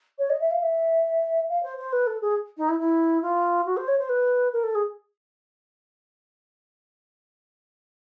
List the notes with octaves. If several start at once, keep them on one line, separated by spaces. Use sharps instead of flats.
C#5
D#5
E5
F5
E5
F5
C5
C5
B4
A4
G#4
D#4
E4
E4
F4
F#4
C5
C#5
C5
B4
A#4
A4
G#4